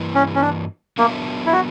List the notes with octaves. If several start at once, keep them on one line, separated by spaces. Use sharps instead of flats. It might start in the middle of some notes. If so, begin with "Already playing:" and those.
Already playing: G2 E3 A#3 E4 B4
C#4
C#4
D4
F#3 A#3 B3 D4 A#4 E5
E4
F#4